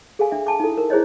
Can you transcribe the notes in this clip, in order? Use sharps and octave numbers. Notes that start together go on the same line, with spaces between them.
G#4 A4 F5 G#5
D4 E5
G#5 A5 D6
D#4 E4 A4
A#4
E4 G#4 C5 C#5 D#5